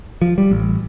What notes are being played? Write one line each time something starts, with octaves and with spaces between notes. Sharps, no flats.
F3
G3
A1